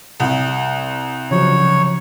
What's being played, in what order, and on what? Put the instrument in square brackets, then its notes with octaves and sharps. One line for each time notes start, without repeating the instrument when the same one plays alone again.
[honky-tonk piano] C2
[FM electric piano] C#3 F3 F#3 [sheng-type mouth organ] C#5